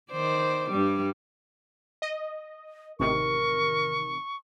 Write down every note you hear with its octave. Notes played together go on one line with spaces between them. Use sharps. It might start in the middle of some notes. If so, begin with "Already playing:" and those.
D#3 C5 D5
G2 G3
D#5
A1 C3 D#3 A#4 C#6